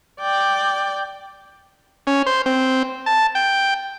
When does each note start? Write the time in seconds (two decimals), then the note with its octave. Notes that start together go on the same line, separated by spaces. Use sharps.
0.21 D5 G5
2.07 C#4
2.26 C5
2.46 C4
3.06 A5
3.35 G5